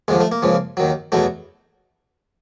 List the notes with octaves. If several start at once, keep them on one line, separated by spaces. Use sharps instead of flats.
D#2 D3 F3 G#3
A3
A#3
C#2 C#3 F3
D#2 D#3 F#3
E2 B2 F#3 A3